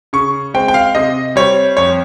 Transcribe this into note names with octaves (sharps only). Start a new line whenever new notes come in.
C#3 C#6
G#3 C4 G5
G5
F5
C3 D#5
G3 C4 C#5
F2 C#5